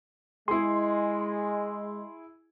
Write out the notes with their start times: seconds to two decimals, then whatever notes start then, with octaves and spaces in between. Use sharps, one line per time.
0.48 G#3 E4 G#4 C6